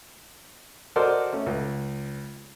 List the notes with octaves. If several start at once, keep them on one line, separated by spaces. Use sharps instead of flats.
F#4 A4 A#4 C5 D5 D#5
A3 C#4
C#2